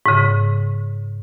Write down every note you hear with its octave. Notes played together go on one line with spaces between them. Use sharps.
G#2 C#3